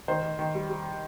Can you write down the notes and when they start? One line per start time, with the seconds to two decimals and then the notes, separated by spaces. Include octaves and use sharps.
0.08 D#3 C5
0.23 D#3
0.39 D#3
0.55 G3
0.70 G3